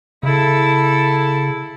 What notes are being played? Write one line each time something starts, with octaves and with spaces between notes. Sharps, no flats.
C#3 E4 A4